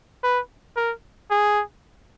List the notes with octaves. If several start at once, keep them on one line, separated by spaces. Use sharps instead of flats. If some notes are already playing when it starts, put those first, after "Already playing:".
B4
A#4
G#4